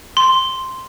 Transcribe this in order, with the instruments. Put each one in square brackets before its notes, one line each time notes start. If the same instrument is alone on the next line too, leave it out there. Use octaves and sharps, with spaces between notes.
[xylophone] C6